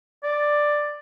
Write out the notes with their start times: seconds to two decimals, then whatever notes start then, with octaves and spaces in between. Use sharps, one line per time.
0.24 D5